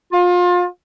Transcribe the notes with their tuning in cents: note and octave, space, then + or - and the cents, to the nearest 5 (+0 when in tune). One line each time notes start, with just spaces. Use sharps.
F4 +30